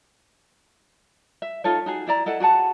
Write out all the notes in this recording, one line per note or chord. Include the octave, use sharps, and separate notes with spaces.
E5
D#4 F4 A4 C#5
D#4 F#4 G#4
E4 D5 A#5
E4 A4 D#5 F#5
F#4 G#4 F#5 A5